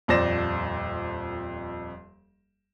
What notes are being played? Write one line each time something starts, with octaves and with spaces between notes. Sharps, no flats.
D#1 F2 C5 D5 A#6 E7